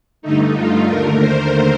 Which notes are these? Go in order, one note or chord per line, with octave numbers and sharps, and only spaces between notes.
G2 D3 A3 D#4
F4
D#2 D3 A3 A#4
C5